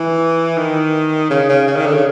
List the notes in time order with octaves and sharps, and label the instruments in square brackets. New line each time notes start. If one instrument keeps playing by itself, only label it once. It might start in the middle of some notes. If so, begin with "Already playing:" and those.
Already playing: [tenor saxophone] E3
D#3
C#3
C#3
C#3
D#3
D3
C#3